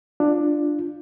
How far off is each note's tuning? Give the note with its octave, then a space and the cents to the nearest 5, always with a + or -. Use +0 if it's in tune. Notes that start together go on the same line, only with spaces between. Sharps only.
D4 +10 F4 -10